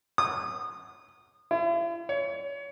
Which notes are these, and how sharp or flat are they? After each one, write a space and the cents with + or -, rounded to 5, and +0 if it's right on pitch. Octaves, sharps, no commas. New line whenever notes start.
D#6 -25
E4 +45
C#5 +30